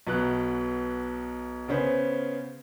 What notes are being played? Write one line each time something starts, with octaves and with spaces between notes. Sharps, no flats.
B1 B2 F#6
C#3 B3 C#4 C5